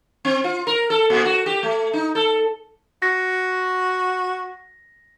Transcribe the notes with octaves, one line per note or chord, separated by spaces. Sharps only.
C4
F4
A#4
A4
A#2
F#4
G4
A3
D#4
A4
F#4 A#6